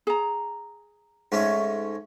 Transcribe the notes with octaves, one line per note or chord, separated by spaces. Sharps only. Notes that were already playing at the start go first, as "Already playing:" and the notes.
G#4 A#5
G#2 A3 C#4